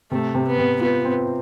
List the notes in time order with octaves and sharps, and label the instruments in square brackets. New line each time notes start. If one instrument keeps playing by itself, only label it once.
[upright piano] C3 [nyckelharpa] A3
[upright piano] C3
[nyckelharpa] B3
[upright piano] C3
[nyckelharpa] B3 [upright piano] F4
[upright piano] C4